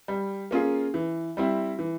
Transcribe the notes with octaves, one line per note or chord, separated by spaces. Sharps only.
G3
A#3 C#4 F4 G#4
E3
G3 C4 E4
E3